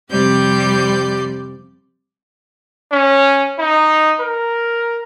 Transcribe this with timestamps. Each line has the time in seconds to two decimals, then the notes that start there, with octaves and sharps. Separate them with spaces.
0.11 F2 C3 G3 G4 D5 G6
2.92 C#4
3.59 D#4
4.20 A#4